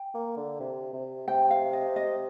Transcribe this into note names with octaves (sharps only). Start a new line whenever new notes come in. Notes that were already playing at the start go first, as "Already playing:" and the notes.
Already playing: G5
A#3
D3
C3
C3
C3 G5
F5
D#5
D#5